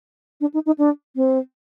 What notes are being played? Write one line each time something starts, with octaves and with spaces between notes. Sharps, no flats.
D4
D#4
D#4
D4
C4